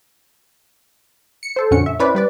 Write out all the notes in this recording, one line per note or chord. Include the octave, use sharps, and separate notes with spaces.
C#7
A4 C5
F2 A#2 D3 C#4 F#4 C#7
E5
C#4 E4 B4 C5 D5
G3 B4 D5